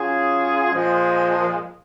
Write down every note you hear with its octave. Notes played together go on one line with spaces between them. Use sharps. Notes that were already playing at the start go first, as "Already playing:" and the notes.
Already playing: F#3 C#4 F4 G#4
A#2 F3 G#3